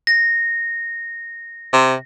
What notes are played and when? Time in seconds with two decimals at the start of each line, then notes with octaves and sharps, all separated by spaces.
0.07 A#6
1.73 C3